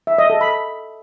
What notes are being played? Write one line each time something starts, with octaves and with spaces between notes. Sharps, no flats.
E5
D#5
A4
B5